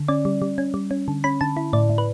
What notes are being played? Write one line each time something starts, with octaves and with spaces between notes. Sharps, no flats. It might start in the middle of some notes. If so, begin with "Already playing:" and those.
Already playing: D3
C#4 D5
G3
G3
C#4
G3
C#4
D3
C#4 B5
D3 A5
E4
A2 D5
A2
B4